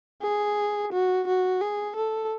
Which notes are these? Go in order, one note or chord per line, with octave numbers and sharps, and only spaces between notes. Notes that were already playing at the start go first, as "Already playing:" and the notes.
G#4
F#4
F#4
G#4
A4